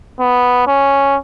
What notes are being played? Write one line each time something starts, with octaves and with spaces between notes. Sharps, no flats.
B3
C#4